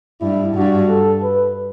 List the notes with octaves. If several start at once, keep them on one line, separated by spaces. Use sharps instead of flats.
G2 E4
G2 F#4
A4
B4